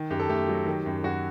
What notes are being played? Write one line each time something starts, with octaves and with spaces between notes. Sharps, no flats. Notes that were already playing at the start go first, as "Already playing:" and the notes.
Already playing: D#3
F#2 G4
A4
A3 G4
F#3
D#3
F#2
F#2 F#4